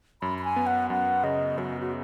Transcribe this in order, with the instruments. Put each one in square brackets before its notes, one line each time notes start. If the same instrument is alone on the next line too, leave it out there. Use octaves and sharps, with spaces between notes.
[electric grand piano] F#2 [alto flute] B5
[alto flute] B5
G#5
[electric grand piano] B3
[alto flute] F#5
[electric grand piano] F#2 [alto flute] F#5
[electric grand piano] C#3 [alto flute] D#5
[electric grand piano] F#2 [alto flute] F#4
[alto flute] F#4